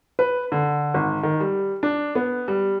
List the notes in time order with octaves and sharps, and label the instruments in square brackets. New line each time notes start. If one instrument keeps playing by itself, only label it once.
[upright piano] B4
D3
G#1
D#3
G3
D4
B3
G3